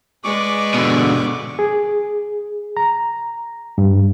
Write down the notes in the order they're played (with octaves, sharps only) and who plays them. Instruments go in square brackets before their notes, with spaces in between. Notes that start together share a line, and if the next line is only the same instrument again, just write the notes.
[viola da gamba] G#3 B4 D5 [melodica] C#6 D6
[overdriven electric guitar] B2 D3
[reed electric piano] G#4
A#5
G2